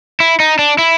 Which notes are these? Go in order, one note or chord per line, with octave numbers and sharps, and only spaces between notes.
E4
D#4
D4
E4